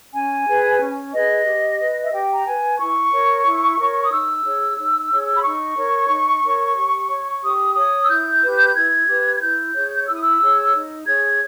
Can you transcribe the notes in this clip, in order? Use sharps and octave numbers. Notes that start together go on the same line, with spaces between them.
C#4 G#5
G#4 B4
C#4
G#4 B4 D#5
G4
B4
E5
G4 G5
A#5
B4 G#5
E4 C#6
A#4 C#5
E4
A#4 C#5
D#6
D#4 E6
G#4 C#5
D#4
G#4 C#5
B5
D#4 C#6
A#4 C#5
D#4
A#4 C#5
G4
C#5
G4 D#6
C#5 D#6
E6
E4 G6
G4 B4
E4 G#6
G4 B4
G#6
E4 G6
G#4 C#5
E4 E6
D#6
E6
G#4 C#5
D#4
G#4 C#5 G#6